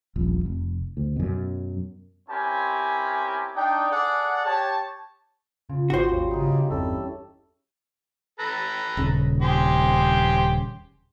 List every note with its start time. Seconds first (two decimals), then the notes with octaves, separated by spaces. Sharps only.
0.16 D#1 A#1
0.46 F1
0.97 D2
1.16 F#2 B2
2.29 C4 C#4 E4 G4 A#4 G#5
3.55 D4 D#4 G5
3.90 G#4 A4 D5 F#5
4.44 G4 C#5 A5
5.69 C#3 F4
5.90 G#1 C#4 F#4 G4 C5
6.09 D#2 G3
6.31 C#3 D#4 E4 G#4
6.54 G4
6.70 G1 E2 G3 C4 C#4 E4 A4
8.39 A4 B4 A#5
8.97 D#1 C#3
9.42 G4 G#4 C5